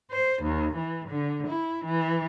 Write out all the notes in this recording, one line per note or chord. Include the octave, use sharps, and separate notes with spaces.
C5
D#2
E3
D3
E4
E3